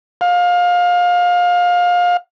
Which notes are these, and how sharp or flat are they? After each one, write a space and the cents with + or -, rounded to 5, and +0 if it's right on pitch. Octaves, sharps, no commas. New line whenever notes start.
F5 +25